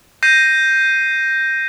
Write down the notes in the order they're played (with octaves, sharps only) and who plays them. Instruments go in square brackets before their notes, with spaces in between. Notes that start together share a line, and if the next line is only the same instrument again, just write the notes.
[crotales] G6 A#6 C7 D#7